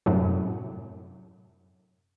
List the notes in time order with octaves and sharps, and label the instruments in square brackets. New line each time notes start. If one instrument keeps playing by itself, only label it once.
[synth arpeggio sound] F#2 A2 C3 F#3